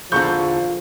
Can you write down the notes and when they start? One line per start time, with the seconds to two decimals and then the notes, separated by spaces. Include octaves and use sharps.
0.12 E2 A#2 D3 F3 C#6 G6